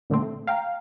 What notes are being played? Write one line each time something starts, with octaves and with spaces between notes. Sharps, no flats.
A#2 D3 A3 C4
A3
F5 G5 A#5